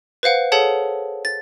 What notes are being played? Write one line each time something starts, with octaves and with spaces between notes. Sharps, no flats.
B4 C5 F5 F#5
G#4 A4 C#5 F#5 A5
A6